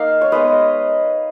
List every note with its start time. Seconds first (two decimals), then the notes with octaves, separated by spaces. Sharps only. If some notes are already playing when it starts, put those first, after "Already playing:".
Already playing: A#3 D#4 F5
0.21 C#5
0.32 G#3 B3 D#4 B4 D#5